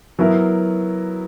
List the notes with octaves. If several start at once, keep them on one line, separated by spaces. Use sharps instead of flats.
F#3 B3 E4 A#4